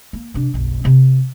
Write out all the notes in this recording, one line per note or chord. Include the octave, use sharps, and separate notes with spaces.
A#3
C3 D4
F#1 B1
C3 E4